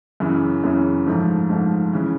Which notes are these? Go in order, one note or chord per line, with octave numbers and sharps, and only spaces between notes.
F#2 C#3 E3
F#2 C#3 E3
G#2 F3 A3
G#2 F3 A3
C#3 E3